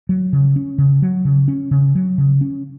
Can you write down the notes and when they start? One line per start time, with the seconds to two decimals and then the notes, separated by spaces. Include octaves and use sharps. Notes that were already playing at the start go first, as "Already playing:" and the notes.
0.09 F#3
0.33 C#3
0.56 C#4
0.78 C#3
1.02 F#3
1.25 C#3
1.48 C#4
1.71 C#3
1.95 F#3
2.18 C#3
2.41 C#4